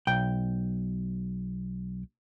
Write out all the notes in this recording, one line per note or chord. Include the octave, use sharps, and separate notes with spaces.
B1 G5